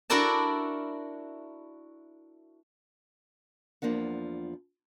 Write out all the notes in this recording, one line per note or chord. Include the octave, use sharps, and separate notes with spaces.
D4 E4 F#4 A#4 D5 A5
E2 F3 A#3 D4 F#5